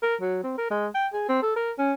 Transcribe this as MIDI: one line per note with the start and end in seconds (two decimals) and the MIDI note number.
0.02 0.15 70
0.21 0.40 54
0.44 0.56 60
0.58 0.69 70
0.71 0.87 56
0.95 1.07 79
1.13 1.28 68
1.29 1.42 60
1.42 1.54 69
1.56 1.72 70
1.78 1.93 61